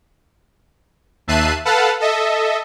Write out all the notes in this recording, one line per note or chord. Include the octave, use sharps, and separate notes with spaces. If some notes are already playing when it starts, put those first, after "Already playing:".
D#2 E5 A5 F#6 C7 D#7
A4 B4 F5 F#5 A5
A4 D#5 E5